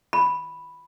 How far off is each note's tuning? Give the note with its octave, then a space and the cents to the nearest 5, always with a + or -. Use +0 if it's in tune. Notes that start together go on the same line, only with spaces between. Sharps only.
B5 +0